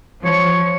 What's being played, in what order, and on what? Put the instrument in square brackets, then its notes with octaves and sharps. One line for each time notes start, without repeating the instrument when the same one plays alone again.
[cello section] F3 [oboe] C#5